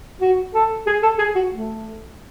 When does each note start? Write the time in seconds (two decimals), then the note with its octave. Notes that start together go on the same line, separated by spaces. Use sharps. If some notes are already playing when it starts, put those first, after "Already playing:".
0.21 F#4
0.54 A4
0.87 G#4
1.03 A4
1.19 G#4
1.35 F#4
1.52 A3